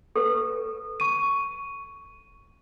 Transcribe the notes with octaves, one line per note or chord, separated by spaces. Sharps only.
A4 B4
C#6 D#7